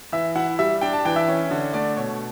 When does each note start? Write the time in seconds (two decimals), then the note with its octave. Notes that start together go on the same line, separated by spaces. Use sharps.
0.12 E3 E5
0.35 E4 F#5
0.59 G3 E5
0.81 D4 G5
0.93 A5
1.05 E3 G5
1.16 E5
1.28 C#4
1.51 D3
1.74 A3 D5
1.96 B2 C#5